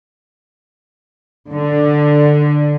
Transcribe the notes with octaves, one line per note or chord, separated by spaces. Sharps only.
D3